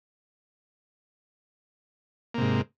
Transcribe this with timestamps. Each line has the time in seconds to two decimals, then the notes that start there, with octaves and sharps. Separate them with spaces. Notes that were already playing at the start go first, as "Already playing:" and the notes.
2.34 A#3
2.38 C3
2.41 G#2